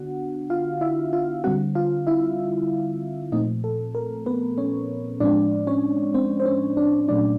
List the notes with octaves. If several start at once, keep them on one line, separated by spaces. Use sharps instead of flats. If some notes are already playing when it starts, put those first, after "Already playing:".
Already playing: D3 B3 D4 F#4 F#5
F4 F5
E4 E5
F4 F5
D3 G3 C4 F#4 F#5
F4 F5
E4 E5
A#2 F3 A3 C4 D#4 D#5
A4
A#4
B3 B4
C#4 C#5
A2 F3 G#3 C4 D4 D5
C#4 C#5
C4 C5
C5
C#4 C#5
D4 D5
A#2 F#3 A3 C#4 D4 D5